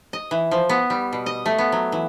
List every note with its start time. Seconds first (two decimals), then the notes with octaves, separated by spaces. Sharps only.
0.13 D#5
0.31 E3
0.51 F3
0.69 B3
0.90 G3
1.13 B2
1.26 D#5
1.46 A3
1.58 B3
1.72 F#3
1.92 E3